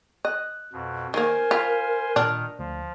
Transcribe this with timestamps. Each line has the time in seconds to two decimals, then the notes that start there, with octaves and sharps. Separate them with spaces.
0.25 D#5 F#6
0.73 F2 B2
1.14 D#3 A#3 A#4 C5 G#5 C6
1.51 F4 B5 B6
2.16 A#2 D#3 D4 F6
2.59 D2 F3